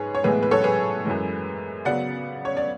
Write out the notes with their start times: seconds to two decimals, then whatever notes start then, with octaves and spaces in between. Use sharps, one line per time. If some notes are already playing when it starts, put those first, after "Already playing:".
Already playing: G#2 G#4 B4 C#5
0.15 C#5
0.24 A2 E3 G#3 B3 G#4 B4
0.43 B4
0.51 A4 C#5
0.64 G#4 B4
1.05 F#2 E3 G#3
1.85 C#3 F#3 B3 D5 F#5
2.45 C#5
2.57 D5